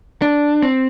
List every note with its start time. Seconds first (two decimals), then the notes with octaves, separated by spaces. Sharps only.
0.22 D4
0.62 C4